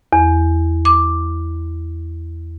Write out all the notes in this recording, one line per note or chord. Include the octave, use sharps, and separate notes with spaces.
E2
D6